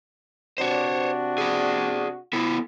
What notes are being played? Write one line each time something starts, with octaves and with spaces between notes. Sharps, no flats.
C3 D4 F#4 C5 C#5
G#4 D5
B3 E4 A4